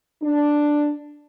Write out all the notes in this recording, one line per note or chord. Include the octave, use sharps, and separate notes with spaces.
D4